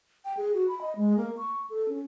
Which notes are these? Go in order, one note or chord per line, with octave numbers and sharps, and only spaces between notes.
G5
G#4
F#4
B5
D#5
G#3
A#3
C#6
A4
C#4